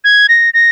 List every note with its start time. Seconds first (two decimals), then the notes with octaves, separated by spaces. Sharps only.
0.04 G#6
0.29 A#6
0.54 A#6